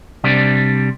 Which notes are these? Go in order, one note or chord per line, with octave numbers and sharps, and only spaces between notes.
C3 G3 D4